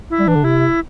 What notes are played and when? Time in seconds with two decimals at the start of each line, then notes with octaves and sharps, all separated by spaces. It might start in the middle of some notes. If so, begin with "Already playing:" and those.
0.10 E4
0.19 G3
0.27 E3 D4
0.36 D3
0.44 C3 E4